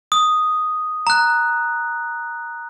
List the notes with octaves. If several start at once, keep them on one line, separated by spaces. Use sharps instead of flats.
D#6
A#5 F#6